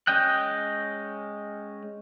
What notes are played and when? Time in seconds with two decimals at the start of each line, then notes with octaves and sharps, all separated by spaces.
0.07 G#3 C#4 D#5 G5 F#6